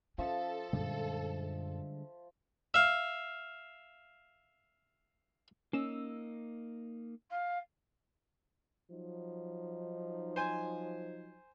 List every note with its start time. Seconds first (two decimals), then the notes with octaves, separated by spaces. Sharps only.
0.18 F3 C#4 A4 E5 D#6
0.73 F#2 A#2 D3 G3 G#3
2.74 E5 F5
5.73 A#3 C#4 D#4 E6
7.30 F5
8.91 F3 F#3 D#4
10.36 C5 G#5